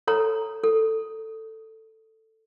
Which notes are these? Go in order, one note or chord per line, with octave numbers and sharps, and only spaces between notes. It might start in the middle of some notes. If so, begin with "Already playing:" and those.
A4 C#5 A#5
A4